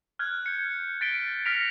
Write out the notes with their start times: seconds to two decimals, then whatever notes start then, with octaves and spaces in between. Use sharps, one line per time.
0.19 F6 F#6 G#6
0.46 G6 C#7
1.01 A6 B6 D7 G7
1.45 F6 A#6 B6 C#7 D7 F7